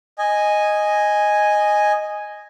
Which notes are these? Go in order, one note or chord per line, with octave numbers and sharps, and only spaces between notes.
D#5 G#5